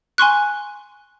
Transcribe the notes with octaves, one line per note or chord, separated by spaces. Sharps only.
G#5 C6 C#6 F#6